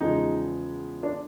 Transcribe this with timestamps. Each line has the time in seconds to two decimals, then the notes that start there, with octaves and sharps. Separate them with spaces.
0.01 E2 C#3 F3 G#3 D#4
1.03 D4